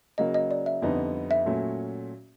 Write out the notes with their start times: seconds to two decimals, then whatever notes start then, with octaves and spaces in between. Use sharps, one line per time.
0.18 C#3 F#3 A#3 D#5
0.34 D#5
0.51 D5
0.66 E5
0.82 F2 D3 G3 B3 D#4
1.31 E5
1.46 A#2 F#3 A3 C#4